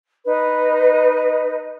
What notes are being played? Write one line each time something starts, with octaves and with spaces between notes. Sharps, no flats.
D#4 B4 D#5